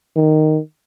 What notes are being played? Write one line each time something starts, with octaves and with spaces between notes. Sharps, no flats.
D#3